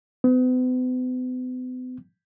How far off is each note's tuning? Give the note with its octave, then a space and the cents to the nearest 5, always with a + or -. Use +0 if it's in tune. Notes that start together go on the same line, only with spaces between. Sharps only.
B3 +45